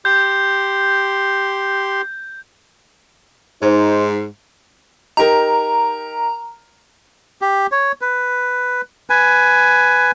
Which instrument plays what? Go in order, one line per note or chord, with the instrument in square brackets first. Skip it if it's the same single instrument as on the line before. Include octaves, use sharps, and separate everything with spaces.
[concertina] G4 C6 [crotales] G6
[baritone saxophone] G#2 [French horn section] D#4 C5
[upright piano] D#4 G4 A#4 [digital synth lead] A#5
[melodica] G4
C#5
B4
B4 G#5